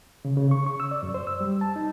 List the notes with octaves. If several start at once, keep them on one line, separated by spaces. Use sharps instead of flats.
C#3
C#3
C#6
C#6
E6
D5
F#2
C5
E6
G3
A5
D#4